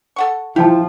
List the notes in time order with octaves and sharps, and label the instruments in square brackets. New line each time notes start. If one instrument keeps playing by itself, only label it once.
[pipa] A4 F#5 C#6
[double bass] F3 [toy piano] D#4 G5 A5 [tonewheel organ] E4 [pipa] G4